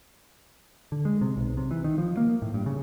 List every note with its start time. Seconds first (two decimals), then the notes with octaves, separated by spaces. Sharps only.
0.92 D3
1.05 G#3
1.21 C3
1.36 B1
1.57 C3
1.71 E3
1.84 D#3
1.98 F3
2.17 A#3
2.42 A2
2.54 G2
2.66 C#3